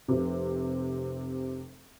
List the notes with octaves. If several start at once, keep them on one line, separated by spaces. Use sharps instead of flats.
F1 C3